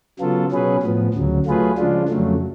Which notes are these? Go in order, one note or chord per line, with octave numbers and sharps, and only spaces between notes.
C#3 F#3 B3 F4 A4
B2 F#3 C#4 G#4 B4
A2 F3 B3
D2 C#3 F#3
F#3 A3 F4 G#4 B4
C#3 F3 G#3 D4 F4
F2 C#3 F#3 A3